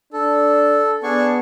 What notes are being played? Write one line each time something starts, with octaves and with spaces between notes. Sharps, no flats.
D4 A4
B3 D4 G#4 C#6